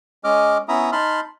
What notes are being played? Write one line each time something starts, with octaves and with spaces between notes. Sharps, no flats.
G#3 C#4 D#5 D6 F6
B3 C#4 E4 E5 A#5 D#6
D#4 A5 B5 C6 F6